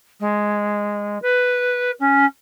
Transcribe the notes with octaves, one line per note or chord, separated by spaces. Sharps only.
G#3
B4
C#4